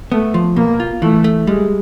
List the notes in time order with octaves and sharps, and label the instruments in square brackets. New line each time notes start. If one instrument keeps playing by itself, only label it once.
[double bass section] A3 [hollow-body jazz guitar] B3
[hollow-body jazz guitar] F3
[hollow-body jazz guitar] B2 [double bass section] A#3
[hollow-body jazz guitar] F4
[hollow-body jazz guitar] E3 [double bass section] A3
[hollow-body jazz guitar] A3
[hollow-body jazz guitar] G3 [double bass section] G#3